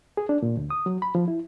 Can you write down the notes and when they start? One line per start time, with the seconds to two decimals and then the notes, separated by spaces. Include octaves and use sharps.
0.17 G#4
0.29 D4
0.43 A#2
0.57 D2
0.70 D#6
0.86 F#3
1.02 B5
1.15 F3
1.28 E4